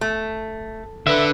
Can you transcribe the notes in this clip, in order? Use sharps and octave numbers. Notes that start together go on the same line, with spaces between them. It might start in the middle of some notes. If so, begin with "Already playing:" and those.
A3
D3 B4 E5